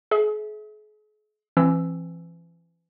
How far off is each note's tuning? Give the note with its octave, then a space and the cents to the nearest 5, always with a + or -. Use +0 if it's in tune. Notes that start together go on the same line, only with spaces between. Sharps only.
G#4 +40 E5 -20
E3 +35 C4 +40 E6 +0